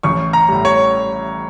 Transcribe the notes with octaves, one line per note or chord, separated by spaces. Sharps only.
A1 C#6
A#5
A2 G3
C#5